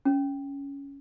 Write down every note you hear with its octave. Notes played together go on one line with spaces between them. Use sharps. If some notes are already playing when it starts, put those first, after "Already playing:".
C#4